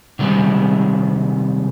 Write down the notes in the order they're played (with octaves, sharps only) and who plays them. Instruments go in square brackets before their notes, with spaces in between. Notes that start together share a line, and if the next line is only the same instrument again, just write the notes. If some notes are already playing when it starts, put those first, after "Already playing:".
[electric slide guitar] C3 D#3 G3 G#3